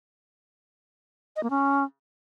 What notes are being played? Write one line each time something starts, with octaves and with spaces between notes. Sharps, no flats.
D#5
A#3
C#4